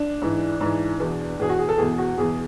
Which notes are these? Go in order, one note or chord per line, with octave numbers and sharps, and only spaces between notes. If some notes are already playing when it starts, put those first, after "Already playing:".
Already playing: D4
G#2 E3
G#2 E3
E2 B2
E2 B2 G#4
F#4
G#4
A4
E2 B2 G#4
F#4
E2 B2 G#4